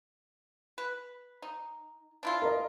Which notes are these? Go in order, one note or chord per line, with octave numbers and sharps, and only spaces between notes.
B4
D#4
D4 E4 F4
A#4 D#5